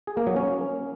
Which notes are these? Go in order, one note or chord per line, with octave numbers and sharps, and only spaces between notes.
G#4
A#3
F#3
C#4